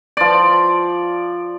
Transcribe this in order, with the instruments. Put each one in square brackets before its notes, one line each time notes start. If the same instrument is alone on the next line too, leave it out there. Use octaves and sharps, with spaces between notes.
[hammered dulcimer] F3 D5